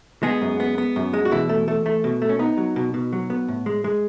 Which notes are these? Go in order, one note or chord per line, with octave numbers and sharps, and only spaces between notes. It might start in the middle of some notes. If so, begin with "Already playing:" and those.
G#3 B3 G#4
F#2
B3
B3
F#2
G#3
F#4
B2 E3 E4
A3
A3
A3
B2
A3
C#4
B3 D#4
F#3
B2
B2
F#3
B3
A2
G#3
G#3